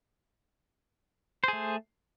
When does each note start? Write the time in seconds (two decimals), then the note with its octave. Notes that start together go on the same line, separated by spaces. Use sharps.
1.44 C5
1.48 G#4
1.53 A3